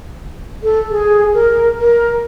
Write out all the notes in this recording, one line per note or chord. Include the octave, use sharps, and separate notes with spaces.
A4
G#4
A#4
A#4